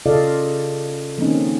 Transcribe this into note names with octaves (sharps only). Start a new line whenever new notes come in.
C#3 F4 A4 D5 D#5 F5
D#3 F3 A#3 C4 C#4 D#4